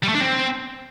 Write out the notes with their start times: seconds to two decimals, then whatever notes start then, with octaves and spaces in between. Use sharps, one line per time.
0.03 G3
0.09 A3
0.15 D4
0.20 C4